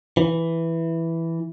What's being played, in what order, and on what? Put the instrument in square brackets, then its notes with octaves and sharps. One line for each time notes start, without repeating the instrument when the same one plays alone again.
[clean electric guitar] E3